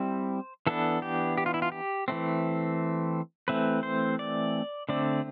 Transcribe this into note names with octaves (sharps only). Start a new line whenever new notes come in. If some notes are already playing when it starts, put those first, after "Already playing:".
Already playing: G3 C4 E4 C5
E3 B3 D4 A4
G4
G4
F4
E4
F4
G4
E3 A3 C4
E3 A3 C4 B4
C5
D5
D3 A3 C4 D5